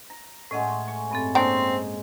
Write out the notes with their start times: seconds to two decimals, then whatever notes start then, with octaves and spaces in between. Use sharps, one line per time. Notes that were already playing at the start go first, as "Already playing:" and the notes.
0.10 A#5
0.51 A2 G#3 A3 C#4 D#5 F#5
0.88 C#6
1.11 G2 C4 A4
1.35 G#2 C#3 A#3 C4 D4 G5 C#6